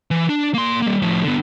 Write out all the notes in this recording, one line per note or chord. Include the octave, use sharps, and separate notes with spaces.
E3
D4
A#3 C6
G3 A#3
A2 F3
D3 B3